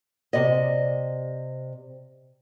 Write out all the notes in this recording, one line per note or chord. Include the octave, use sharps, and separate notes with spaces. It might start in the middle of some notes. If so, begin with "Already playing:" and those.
C3 D5 D#5